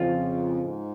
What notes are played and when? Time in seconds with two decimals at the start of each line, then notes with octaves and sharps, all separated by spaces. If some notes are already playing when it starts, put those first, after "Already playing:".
Already playing: F2 C#3 F3 F4
0.64 G#2